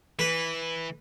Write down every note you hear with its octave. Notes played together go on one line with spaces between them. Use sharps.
E3 B4